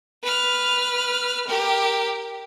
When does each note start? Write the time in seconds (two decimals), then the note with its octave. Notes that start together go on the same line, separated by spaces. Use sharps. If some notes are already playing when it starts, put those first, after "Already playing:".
0.23 B4 F6
1.48 G4 A#4